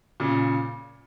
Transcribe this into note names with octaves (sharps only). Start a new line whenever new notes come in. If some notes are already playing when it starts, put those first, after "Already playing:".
A#2 C#3